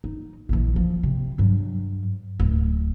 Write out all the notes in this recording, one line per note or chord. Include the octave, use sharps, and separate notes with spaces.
D#4
A#1 E3
F3
C3
G2 F#3
D1